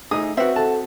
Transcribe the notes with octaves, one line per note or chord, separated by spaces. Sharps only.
A3 D#4 G#4 D#6
C4 F#4 B4 E5 F#5
A4 A5